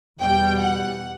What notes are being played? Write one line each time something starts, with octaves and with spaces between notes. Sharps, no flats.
E2 B2 G3 G5
F#5